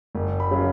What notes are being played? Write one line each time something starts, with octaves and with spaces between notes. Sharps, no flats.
F#1
B5
C#3 F#3